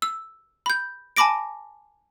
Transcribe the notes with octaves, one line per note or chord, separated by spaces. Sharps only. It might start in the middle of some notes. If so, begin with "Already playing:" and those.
E6
B5 G6
G#5 A5 B5 D6 A#6 D7